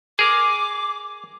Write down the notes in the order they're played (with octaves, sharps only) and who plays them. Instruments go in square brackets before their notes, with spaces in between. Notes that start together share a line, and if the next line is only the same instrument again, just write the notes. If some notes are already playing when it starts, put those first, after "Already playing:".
[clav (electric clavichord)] G#4 A#4 [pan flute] D6